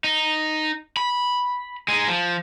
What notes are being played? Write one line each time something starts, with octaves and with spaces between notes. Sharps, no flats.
D#4
B5
G#3 D#4
F3